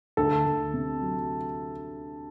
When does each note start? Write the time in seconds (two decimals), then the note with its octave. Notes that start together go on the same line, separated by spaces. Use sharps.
0.17 D2 A4
0.46 D2
0.74 C3
1.01 F#3